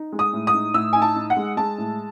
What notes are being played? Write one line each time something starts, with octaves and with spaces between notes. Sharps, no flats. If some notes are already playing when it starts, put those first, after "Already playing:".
Already playing: D#4
G#3
D#6
A2
D#6
D#4
A2 E6
D#4 G#5
A5
D#4
F#5
G#3
G#3 A5
A2